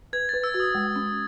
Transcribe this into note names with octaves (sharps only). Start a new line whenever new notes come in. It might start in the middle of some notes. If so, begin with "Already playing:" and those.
B4 G#6
A6
B4
E6
F#4
D#6
G#3
C#4